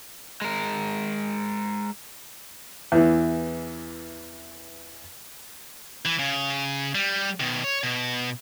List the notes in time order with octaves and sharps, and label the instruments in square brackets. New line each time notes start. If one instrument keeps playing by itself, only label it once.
[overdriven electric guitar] G#3 A#4
[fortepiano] E2 E3
[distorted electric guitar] E3
C#3
G3
B2 D#3
C#5
B2